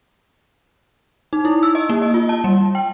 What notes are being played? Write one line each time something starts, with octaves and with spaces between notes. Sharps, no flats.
D#4
E4
E6
D#5
A#3
D#5
F4
A5
G3
G5